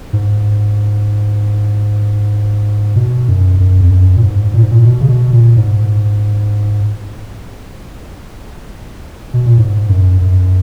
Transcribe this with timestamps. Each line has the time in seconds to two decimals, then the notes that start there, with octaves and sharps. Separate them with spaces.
0.13 G#2
2.96 B2
3.28 F#2
3.60 F#2
3.81 F2
3.91 F#2
4.17 A#2
4.23 G#2
4.54 A#2
4.62 G#2
4.71 A#2
4.85 B2
5.00 C#3
5.09 B2
5.33 A#2
5.57 G#2
9.34 B2
9.46 A#2
9.58 G#2
9.89 F#2
10.21 F#2